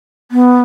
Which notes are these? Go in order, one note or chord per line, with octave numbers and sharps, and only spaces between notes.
B3